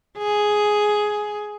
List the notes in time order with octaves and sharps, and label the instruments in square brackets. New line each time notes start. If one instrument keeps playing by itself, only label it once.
[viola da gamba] G#4